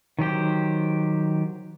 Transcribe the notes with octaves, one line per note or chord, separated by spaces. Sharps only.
D#3 F#3 G4 C5